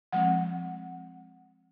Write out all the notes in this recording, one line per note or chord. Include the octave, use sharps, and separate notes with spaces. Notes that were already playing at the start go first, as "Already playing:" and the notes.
F3 G#3 C4 F#5